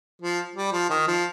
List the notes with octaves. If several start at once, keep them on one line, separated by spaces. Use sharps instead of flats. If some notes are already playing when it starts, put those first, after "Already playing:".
F3
G3
F3
D#3
F3